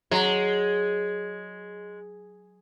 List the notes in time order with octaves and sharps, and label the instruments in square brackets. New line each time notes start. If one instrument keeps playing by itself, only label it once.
[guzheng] F#3 [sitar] G#3